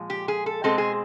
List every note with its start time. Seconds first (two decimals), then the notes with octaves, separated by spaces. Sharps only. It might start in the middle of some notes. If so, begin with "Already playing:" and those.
Already playing: A#2 F3 G#3
0.10 G4
0.28 G#4
0.46 A4
0.64 B2 G#3 C4 A4
0.78 G#4